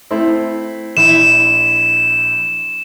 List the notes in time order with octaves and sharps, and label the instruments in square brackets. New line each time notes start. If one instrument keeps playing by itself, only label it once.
[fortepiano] A3 C4 E4
[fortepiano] A#1 E4 [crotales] E7